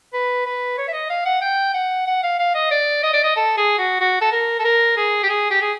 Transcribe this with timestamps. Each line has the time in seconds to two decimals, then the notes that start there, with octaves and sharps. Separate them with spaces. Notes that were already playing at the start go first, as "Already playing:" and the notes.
0.13 B4
0.46 B4
0.78 C#5
0.88 E5
0.93 D#5
1.10 F5
1.25 F#5
1.42 G5
1.74 F#5
2.07 F#5
2.23 F5
2.39 F5
2.55 D#5
2.71 D5
3.03 D#5
3.13 D5
3.24 D#5
3.36 A4
3.57 G#4
3.78 F#4
4.00 F#4
4.22 A4
4.32 A#4
4.59 A4
4.65 A#4
4.97 G#4
5.23 G4
5.29 G#4
5.51 G4
5.61 G#4